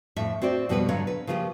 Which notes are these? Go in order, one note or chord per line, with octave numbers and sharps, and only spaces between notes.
F2 A2 E5
C4 F#4 C5 D5
F2 B2 G3 B3 F4 B4
G2 D3 F#3 C#5 F5
B4
C#3 F3 A#3 E4 F4 G4